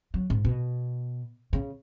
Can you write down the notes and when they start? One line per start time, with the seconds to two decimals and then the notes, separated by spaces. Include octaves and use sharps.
0.14 F#3
0.30 G#2
0.45 B2
1.53 C#3